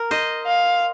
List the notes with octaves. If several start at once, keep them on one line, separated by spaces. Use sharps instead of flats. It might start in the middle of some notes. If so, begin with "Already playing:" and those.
Already playing: A#4
C5 D#5
F5